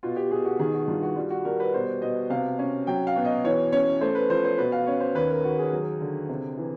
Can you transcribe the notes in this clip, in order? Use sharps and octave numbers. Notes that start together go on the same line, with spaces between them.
B2 F4
G4
B2 G#4
F#4
D#3 G#4
F#4
G2 F4
F#4
G3 F4
F#4
G3 A#4
B4
B2 C5
B2 D#5
C3 F5
C#4
F#3 G5
F5
B2
D#5
E3 C#5
C#4 C#5
A3 C5
B4
F3 C5
C5
B2 B4
F5
C#4 C#5
C5
D#2 B4
A#4
D#2 F#4
G#4
F#3
D3
C3
E3